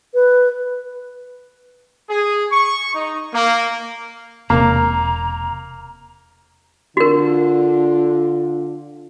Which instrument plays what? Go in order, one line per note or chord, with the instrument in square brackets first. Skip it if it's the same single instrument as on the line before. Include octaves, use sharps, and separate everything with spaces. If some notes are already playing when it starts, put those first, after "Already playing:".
[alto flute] B4
[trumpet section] G#4
C#6
D#4
A#3
[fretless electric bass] E1 C3 [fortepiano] A#3 [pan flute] A#5
[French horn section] D3 D4 F4 [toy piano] F#4 A#4